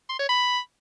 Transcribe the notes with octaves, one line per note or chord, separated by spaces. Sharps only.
C6
C#5
B5